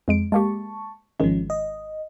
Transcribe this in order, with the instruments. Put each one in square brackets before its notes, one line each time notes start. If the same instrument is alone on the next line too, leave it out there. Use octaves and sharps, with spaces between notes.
[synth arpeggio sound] F2 G#3 D7
[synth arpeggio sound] G#3 A#3 G4 [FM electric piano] A5 C#6
[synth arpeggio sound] G#1 D#3 G#3 [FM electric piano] F3 C#4
[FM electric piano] D#5